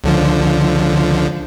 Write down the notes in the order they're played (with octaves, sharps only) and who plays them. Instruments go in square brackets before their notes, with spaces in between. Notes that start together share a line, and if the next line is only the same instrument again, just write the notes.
[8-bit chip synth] C#2 D3 F3